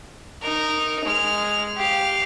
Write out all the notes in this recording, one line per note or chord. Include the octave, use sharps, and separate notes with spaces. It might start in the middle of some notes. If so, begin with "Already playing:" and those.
D#4 A#4
G#3 F6
G4 F5